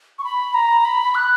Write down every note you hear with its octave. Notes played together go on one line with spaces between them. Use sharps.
C#6
B5
A#5
B5
F#6